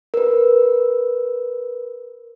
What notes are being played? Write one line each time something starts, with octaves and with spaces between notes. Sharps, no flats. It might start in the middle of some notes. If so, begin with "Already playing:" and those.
A#4 B4